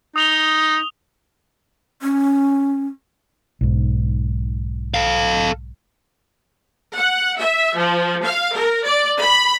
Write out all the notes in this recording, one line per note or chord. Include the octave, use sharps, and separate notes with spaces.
D#4 D#6 F7 G7
C#4
B1 G#2
A4 F5
F#5
E5
F3
F5
A#4
D5
B5